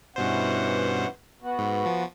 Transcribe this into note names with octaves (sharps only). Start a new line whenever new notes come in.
G2 B2 E3 C#4 C5 F#5
B3 F#4
G#2
F3